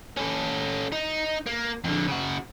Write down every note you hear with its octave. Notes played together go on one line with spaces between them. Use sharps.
C#4 A4
D#4
A#3
F2 D3
C#3 F#4